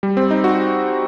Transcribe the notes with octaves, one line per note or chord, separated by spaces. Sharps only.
G3
C4
D#4
F#4